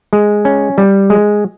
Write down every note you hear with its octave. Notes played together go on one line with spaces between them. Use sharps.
G#3
C#4
G3
G#3